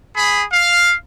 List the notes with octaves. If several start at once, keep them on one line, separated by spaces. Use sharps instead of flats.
G#4 B5
F5